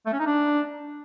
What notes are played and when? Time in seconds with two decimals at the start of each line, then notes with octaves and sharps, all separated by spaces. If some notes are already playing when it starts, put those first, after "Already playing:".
0.06 A3
0.13 C#4
0.20 D#4
0.26 D4